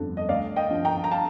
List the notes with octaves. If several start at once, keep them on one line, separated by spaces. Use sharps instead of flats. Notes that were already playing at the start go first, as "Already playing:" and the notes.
Already playing: G1 F2 D3
D#5
D2 D5 F5
D#5 G5
D3 F3
G5 A#5
A#5
F5 A5